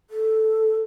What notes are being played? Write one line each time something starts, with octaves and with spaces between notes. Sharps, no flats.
A4